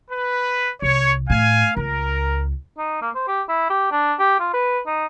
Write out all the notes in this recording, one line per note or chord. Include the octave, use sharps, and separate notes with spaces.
B4
C2 C#5
A2 F5 G#5
C#2 A#4
D#4
A#3
C5
G4
E4
G4
D4
G4
F4
B4
D#4